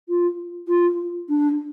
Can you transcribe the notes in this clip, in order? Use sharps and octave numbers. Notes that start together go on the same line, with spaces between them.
F4
F4
D4